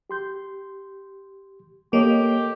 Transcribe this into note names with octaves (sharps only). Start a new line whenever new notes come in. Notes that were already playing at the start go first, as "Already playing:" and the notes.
G4 C6 G6
A#3 G4 A4 C#5 D#5